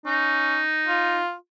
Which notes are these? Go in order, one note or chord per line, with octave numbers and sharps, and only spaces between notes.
C#4 D#4
F4